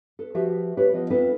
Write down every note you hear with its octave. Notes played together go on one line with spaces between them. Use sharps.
A4 B4
F3 F#4 G4 B4 E5
G4 G#4 B4 C#5
F3 B3 D#5
C4 D4 D#4 F4 A4 B4